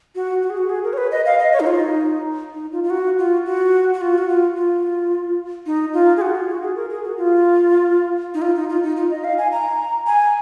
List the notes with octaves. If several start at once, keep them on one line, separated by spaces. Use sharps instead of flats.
F#4
F#4
G#4
F#4
G#4
A#4
C#5
B4
D#5
F5
D#5
C#5
D#4
F4
D#4
D#4
F4
F4
F#4
F4
F#4
F#4
F4
F#4
F4
F4
D#4
F4
G#4
F#4
F4
F#4
G#4
A#4
G#4
F#4
F4
D#4
F4
D#4
F4
D#4
F4
D#5
F5
G#5
A#5
G#5